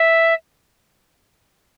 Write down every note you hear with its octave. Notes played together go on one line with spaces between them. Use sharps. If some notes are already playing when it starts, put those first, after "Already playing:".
Already playing: E5